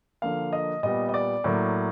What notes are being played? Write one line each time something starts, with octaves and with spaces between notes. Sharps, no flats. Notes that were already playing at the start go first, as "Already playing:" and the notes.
D3 F3 A#3 F5
D#5
A#2 G3 B3 D#5
D#5
D5
A2 F#3 A#3